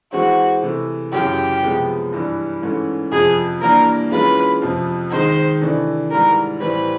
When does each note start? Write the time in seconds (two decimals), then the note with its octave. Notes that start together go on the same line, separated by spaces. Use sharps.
0.13 E3 G#3 C4 F#4
0.63 C3 E3 A3
1.12 F#2 C#3 E3 G4
1.63 C3 F3 G#3 B3
2.13 G2 E3 G3
2.62 G#2 E3 A3 C#4
3.12 F2 C3 F3 G#4
3.62 E3 G3 A#3 D4 A#4
4.11 E3 G#3 C#4 F4 B4
4.62 F2 C3 F3
5.11 D#3 G#3 C4 D#4 C5
5.61 C3 E3 A3 D4
6.11 G#2 E3 G3 A#4
6.61 A2 E3 G3 C4 B4